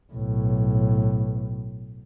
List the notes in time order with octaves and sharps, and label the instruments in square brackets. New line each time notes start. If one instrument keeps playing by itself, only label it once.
[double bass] B1 A2